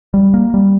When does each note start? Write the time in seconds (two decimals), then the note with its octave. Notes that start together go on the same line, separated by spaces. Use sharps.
0.14 G3
0.34 A#3
0.54 G3